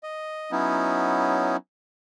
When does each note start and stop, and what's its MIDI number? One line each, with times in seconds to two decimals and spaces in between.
0.03 0.51 75
0.52 1.56 54
0.52 1.56 59
0.52 1.56 61
0.52 1.56 63
0.52 1.56 64